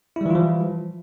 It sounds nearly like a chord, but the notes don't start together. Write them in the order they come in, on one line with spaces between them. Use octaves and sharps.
E4 G3 E3 F4 F3